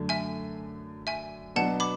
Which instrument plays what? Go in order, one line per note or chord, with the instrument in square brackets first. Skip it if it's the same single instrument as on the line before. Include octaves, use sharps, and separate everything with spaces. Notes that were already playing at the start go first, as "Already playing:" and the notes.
Already playing: [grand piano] F#2 D3 A3
[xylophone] E5 G#5
E5 G#5
[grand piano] B2 F#3 B3 D4 [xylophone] F#5 A5
[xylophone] B5 D6